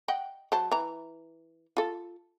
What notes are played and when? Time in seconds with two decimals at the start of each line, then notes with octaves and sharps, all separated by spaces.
0.08 D#5 F#5 G5
0.52 F#3 C5 A5
0.72 E3 A#5
1.77 F4 A4